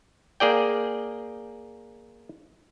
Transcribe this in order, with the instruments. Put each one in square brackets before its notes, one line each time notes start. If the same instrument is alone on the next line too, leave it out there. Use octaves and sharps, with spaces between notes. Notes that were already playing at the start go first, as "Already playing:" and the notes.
[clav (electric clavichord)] A#3 G#4 D5 G5